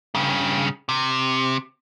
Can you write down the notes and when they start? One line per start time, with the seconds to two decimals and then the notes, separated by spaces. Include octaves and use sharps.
0.15 G2 C#3
0.89 C3